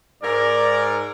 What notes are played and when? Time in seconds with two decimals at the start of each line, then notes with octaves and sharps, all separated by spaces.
0.22 G#2 A#4 D5